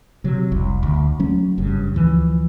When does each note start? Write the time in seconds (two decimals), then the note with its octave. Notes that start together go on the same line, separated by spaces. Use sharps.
0.24 C3 F#3
0.51 F1 C2
0.83 D2
1.20 F#3 A3 C#4
1.58 F#1 G2 C#3
1.95 D2 E3 F3